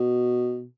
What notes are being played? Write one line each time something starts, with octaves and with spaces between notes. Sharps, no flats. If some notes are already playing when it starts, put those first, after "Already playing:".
Already playing: B2